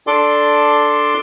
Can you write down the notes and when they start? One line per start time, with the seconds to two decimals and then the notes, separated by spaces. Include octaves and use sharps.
0.07 D4 A4 D5 C6 D6